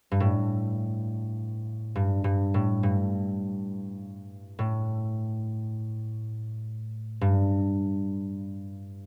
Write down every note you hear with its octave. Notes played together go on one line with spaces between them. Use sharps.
G2
A2
G2
G2
A2
G2
A2
G2